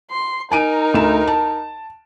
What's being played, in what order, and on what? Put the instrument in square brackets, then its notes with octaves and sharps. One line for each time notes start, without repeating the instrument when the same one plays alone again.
[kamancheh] C6
[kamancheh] D#4 A#4 [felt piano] G#5 D7 D#7
[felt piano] D2 E7
A5